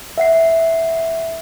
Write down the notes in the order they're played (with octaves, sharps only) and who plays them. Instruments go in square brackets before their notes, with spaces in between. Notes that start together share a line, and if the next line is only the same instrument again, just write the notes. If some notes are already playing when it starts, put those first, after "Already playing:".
[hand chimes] E5 F#5 C7